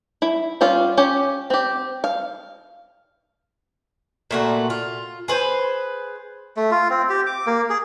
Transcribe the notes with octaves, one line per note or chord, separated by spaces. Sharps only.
E4
G3 C#4 F4 F5
C#4 G4
C4 G4
F5
A#2 A3 F#4
F4
G#4 B4 C5
A3
F4
C4
G4
D6
A#3
G#4